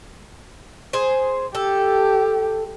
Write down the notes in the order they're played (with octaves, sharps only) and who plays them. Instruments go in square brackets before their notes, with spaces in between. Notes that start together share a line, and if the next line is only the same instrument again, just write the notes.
[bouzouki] G#4 C5
[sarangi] G4 [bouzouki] A4